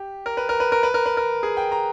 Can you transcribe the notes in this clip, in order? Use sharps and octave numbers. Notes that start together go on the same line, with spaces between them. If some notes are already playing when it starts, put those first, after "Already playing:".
Already playing: G4
A#4
B4
A#4
B4
A#4
B4
A#4
B4
A#4
G#4
G5
A#5